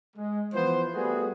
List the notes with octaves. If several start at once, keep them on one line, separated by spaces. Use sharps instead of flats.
G#3
E3 F3 B3 C5
G3 A3 B3 F#4 G#4